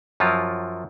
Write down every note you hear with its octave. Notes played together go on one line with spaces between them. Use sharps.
F#2 F3 F#3 F4